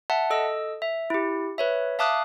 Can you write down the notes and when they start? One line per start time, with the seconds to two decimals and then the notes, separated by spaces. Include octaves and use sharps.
0.10 E5 F#5 A5
0.30 A4 D#5 E6
0.82 E5
1.10 E4 G4
1.58 B4 C#5 E5
1.99 E5 F5 A5 D6 D#6 F#6